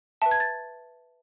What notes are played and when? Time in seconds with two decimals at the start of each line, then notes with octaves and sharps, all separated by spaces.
0.22 B4 E5 A5
0.31 G#6
0.40 A6